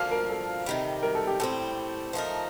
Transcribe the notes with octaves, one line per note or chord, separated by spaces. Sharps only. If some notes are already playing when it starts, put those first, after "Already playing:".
Already playing: D2 D3 F3 A#3 D4 F5
A#4
A4
C3 D#3 G3
A#4
A4
G4
A2 G3 C4 A4
F3 A3 D#4 A#4